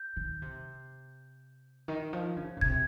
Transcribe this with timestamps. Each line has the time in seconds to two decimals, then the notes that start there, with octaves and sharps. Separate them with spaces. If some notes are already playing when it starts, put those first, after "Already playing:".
Already playing: G6
0.17 D#3
0.42 C3
1.88 D#3
2.13 F3
2.36 C#3
2.57 A#2
2.61 C3 G#6